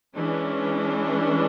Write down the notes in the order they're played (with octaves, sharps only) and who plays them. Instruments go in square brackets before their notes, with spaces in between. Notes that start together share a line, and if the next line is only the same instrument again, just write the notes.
[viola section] E3 G#3 C#4 D4